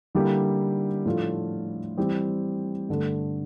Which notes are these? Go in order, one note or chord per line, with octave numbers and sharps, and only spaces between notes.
D3 G3 A#3 E4 G4
A2 F3 A3 D4 F4
E3 G3 C4 G4
G2 D3 A3